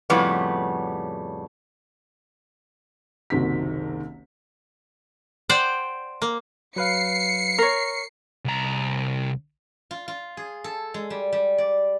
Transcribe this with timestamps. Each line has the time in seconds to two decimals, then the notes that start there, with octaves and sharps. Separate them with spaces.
0.10 F2 A2 C#3 G3 B3
3.30 F#1 C2 D#3 C4 F#4 B6
5.49 C5 D5 F#5 G5
6.22 A#3
6.76 F#3 B4 F5 C7 C#7
7.58 A#4 C#5
8.45 C2 A#5
9.91 F4
10.08 F4
10.37 G#4
10.64 A4
10.94 G#3
11.10 G3
11.33 G3
11.58 D5